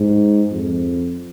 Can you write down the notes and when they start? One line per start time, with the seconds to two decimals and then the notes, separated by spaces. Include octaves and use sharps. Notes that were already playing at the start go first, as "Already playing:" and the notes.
Already playing: G#2
0.51 F2